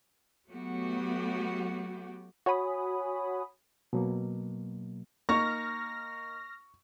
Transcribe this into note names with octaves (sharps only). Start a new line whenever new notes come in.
F#3 A3 B3 F#4 G4
F#4 C#5 G#5 B5 D#6
B2 F#3 A#3
A#3 D#4 C#6 F6 A#6